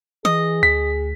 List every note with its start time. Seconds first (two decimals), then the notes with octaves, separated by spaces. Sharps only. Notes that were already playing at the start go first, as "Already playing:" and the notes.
0.25 E3 G#4 D#5
0.63 D2 B6